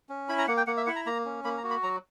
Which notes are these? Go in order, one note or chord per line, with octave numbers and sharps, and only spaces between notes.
C#4
E4 B5
A#5
A#3 F#5
G5
A#3 F#5
E5
E4 F#5
A#5
A#3 A#5
C#4
A#3 B5
A#5
F#4
B5
F#3 A#5